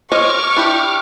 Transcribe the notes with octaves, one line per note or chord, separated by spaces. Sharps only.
C5 C#5 D#5 C#6 D6 F6
D4 E4 G4